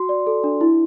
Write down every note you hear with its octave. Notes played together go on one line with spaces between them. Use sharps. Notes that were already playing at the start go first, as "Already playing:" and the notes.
Already playing: F#4 C6
D5
A4
D4
E4